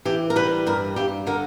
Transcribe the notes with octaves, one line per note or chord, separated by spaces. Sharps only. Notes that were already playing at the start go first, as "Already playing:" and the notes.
E3 G4
A#4
G3 B4
G2 A#4
G2 G4
D3 A#4